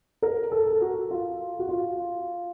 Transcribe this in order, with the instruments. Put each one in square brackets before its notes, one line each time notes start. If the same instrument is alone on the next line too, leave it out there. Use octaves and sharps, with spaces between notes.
[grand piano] A#4
A4
A4
F#4
F4
F#4
F4